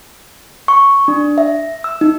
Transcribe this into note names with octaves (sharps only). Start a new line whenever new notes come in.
C#6
D4
E5
E6
D#4